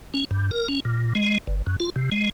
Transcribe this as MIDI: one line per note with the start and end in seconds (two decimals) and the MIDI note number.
0.14 0.24 61
0.31 0.51 43
0.51 0.68 70
0.68 0.80 61
0.85 1.13 46
1.15 1.38 56
1.47 1.62 31
1.67 1.76 42
1.80 1.90 65
1.96 2.10 48
2.12 2.29 56